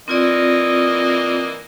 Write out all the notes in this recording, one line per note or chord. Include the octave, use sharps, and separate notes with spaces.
E3 A#3 C4 F4 D5 D#5